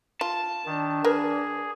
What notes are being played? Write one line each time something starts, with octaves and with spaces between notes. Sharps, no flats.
F4 A5
D#3 D4
G#4 A#4 B4